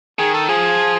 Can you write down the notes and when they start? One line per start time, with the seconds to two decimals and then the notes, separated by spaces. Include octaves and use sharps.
0.19 D#3 G#4
0.34 A4
0.48 F3 G#4